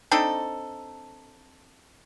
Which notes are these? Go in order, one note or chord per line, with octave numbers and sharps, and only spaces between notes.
C4 D4 D#4 A4